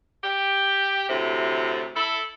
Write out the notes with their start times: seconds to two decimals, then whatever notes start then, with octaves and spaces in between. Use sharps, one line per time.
0.23 G4
1.09 D2 A2 C3
1.95 E4 A4